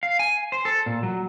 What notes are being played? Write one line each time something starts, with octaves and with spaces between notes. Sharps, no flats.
F5
G#5
C5
A4
A#2
F#3